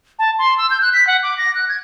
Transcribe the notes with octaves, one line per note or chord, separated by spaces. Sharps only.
A5
C6
E6
G6
F#6
B6
F#5
D6
A#6
F#6
G#6